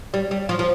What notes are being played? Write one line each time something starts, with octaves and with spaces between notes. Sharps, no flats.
G3
G3
F3
F3